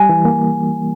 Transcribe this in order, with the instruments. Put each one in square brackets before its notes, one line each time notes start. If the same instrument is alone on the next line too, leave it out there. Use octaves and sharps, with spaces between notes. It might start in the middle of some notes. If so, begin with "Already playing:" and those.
Already playing: [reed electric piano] G3 [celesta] G#5
[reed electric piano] E3
A#3